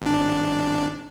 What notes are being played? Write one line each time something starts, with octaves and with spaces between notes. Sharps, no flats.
G#1 D4